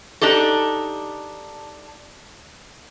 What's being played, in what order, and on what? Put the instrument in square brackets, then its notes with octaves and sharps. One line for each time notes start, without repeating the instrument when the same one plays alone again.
[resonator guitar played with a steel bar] D4 D#4 G4 A4